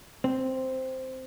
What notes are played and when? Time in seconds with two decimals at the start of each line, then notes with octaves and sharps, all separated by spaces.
0.24 C4